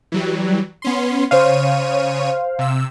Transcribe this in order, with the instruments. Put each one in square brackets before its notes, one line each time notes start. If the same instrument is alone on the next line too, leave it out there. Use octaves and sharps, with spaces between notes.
[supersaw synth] E3 F#3 G3
B3 C#4 C6
[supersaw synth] C#3 C#5 D#7 [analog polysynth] C5 F5
[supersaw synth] C3 E6